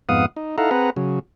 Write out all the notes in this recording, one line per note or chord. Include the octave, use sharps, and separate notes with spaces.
F2 G#2 B3 F5 F#5 D#6
D#4
D#4 E4 A4 F5 F#5 A#5
C4 G#4 B4 F#5 A#5
C#3 F#3